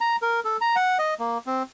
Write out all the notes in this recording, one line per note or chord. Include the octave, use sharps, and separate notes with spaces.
A#5
A#4
A4
A#5
F#5
D#5
A#3
C4